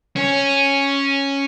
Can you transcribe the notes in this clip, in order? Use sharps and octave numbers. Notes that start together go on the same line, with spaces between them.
C#4